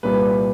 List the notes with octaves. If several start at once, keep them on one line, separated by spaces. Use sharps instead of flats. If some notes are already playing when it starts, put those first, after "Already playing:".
C2 A#2 G3 B4